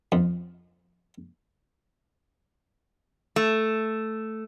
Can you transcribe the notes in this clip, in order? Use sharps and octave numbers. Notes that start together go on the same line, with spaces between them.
F2
A3